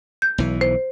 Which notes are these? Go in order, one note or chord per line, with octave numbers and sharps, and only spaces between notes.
G6
B1 E3
C5